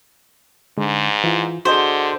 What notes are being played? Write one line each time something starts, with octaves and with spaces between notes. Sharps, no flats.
G#2 D3 G#3
E3 F4
D3 F#4 G#4 C5 D#5